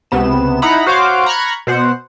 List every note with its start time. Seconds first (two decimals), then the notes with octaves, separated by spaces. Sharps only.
0.11 C#2 C3 B3 E7
0.62 D#4 E4 F#5 A#5 B5
0.86 F#4 C5 C#5 F5 D6
1.26 A#5 B5 C#6 F6 F#6 G#6
1.67 B2 C5 F#5